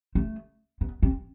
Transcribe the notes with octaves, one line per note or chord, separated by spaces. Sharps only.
A3
B3
C4